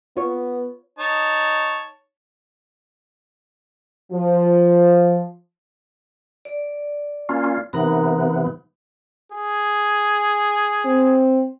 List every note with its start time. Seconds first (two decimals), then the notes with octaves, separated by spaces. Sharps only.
0.17 B3 F4 C#5 C#6
0.99 D#4 C#5 A5
4.12 F3
6.45 D5
7.29 A#3 C#4 F4
7.73 C3 E3 B3 D#4 A#4 A#5
9.32 G#4
10.85 C4